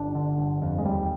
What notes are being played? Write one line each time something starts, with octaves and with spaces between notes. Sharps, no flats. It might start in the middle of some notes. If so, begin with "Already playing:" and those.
Already playing: G1 D4
D3
G1
F2
G#3
D#2 G3